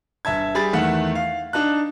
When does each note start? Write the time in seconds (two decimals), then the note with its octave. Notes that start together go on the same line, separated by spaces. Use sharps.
0.25 G1 E5 A5 G#6
0.55 G3 G#4 B5 A6
0.73 E2 D#3 A3 E5 F#5
1.15 F5
1.53 D4 D#4 A5 F#6